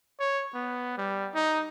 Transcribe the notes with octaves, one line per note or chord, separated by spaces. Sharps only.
C#5
B3
G3
D#4